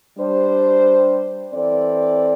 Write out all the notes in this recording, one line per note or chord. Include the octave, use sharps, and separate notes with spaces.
G3 D4 C5
E3 C4 A4 D5